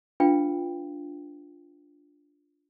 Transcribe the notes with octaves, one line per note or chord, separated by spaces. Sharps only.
D4 F4 B4 F5 G5